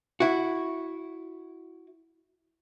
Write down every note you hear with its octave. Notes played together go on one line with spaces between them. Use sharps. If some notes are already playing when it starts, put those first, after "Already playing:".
E4 F#4